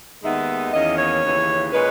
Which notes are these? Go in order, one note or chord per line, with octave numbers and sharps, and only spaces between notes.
D#2 D#3 G#3 B3 D#4 E5
E2 D#3 A#3 C#4 D#5
C#5
D#2 C#3 E3
A#2 G#3 C#4 B4